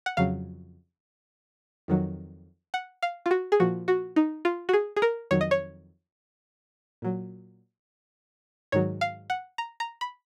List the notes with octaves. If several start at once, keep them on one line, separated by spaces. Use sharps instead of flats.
F#5
F2 C#3 F#3 F5
F2 D#3 F#3
F#5
F5
F4
F#4
G#4
A#2 F3 F#4
F#4
D#4
F4
F#4
G#4
G#4
A#4
F2 D#3 F#3 C#5
D#5
C#5
A#2 F#3
G#2 D#3 F#3 C#5
F5
F#5
A#5
A#5
B5